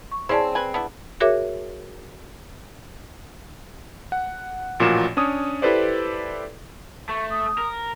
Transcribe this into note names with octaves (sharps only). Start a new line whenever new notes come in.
C#6
C4 C#4 E4 G#4 D5 A5
B4 G#5
B3 D4 E4
F#4 G#4 A#4 C#5 E5 D6
F#5
A1 A#2 F3 A#3 F#4 E7
C#4 D4 C#5 D#6
E4 G4 A4 B4 C5 D5
A3 C#6
D#6
A#4